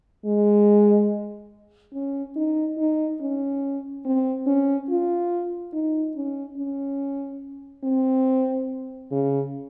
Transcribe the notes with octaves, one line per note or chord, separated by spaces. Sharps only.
G#3
C#4
D#4
D#4
C#4
C4
C#4
F4
D#4
C#4
C#4
C4
C#3